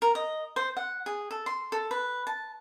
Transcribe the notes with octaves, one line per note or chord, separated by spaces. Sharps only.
A#4
D#5
C5
F#5
G#4
A4
C6
A4
B4
A5